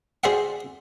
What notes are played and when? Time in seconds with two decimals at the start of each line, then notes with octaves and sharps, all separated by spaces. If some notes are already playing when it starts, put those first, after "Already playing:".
0.24 F#4 G#4 C5 D5 E5 F#5